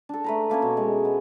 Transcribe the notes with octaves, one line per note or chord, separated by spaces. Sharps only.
D4 A4
A3 B4 A#5
A3 A#3 C#4 C#5
B2
G#3
B3